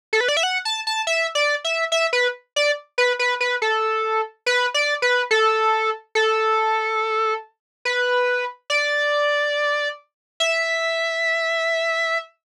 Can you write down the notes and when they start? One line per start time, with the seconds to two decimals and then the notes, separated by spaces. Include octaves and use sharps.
0.13 A4
0.21 B4
0.28 D5
0.37 E5
0.43 F#5
0.65 A5
0.87 A5
1.07 E5
1.35 D5
1.64 E5
1.92 E5
2.13 B4
2.56 D5
2.98 B4
3.19 B4
3.40 B4
3.62 A4
4.46 B4
4.74 D5
5.02 B4
5.31 A4
6.15 A4
7.85 B4
8.70 D5
10.40 E5